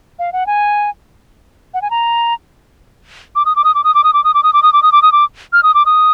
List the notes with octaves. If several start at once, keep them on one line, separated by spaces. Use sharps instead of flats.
F5
F#5
G#5
F#5
G#5
A#5
D6
D#6
D6
D#6
D6
D#6
D6
D#6
D6
D#6
D6
D#6
D6
D#6
D6
D#6
D6
D#6
D6
F6
D#6
D6
D#6